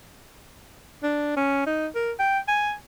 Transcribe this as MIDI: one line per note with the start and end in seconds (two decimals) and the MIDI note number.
1.03 1.36 62
1.36 1.64 61
1.67 1.87 63
1.95 2.12 70
2.19 2.39 79
2.48 2.74 80